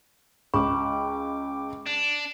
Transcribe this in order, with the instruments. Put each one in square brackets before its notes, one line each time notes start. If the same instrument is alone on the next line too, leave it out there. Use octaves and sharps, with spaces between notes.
[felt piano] C#2 [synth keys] G5 D6 [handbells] B5 C#6
[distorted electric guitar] D4